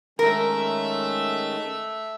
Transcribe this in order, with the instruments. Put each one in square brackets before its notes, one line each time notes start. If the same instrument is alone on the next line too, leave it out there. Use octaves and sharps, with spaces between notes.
[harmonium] D#3 G#3 C#4 [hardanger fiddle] A3 E5 [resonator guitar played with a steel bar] A#4